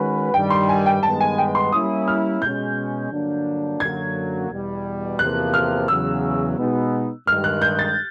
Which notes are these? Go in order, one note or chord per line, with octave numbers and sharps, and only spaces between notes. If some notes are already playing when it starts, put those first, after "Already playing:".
Already playing: D#3 G#3 C#4 F#4 B4
G2 D#3 G3 G5
C6
G#5
G5
G2 D#3 G#3 B3 A5
G#5
G5
C6
G3 A#3 C#4 E4 D#6
F6
B2 G#3 C#4 G6
G2 D3 F#3 A#3 D4
F#2 D3 F#3 A#3 G#6
E2 B2 G3
E2 C3 F3 A#3 F#6
F6
E2 C#3 F#3 E6
B2 G#3 B3 D#4
G2 D#3 G#3 F6
F#6
G6
A6